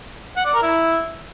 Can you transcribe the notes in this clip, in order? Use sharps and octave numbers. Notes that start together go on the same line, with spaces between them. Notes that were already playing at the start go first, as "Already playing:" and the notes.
F#5
D5
A#4
E4